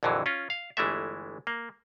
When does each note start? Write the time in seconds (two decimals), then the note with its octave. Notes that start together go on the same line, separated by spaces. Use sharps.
0.03 A#1 F2 D3 E3 F#3
0.26 C#4 F4
0.50 F5
0.77 G1 E3 G#3 A3 E5
1.47 A#3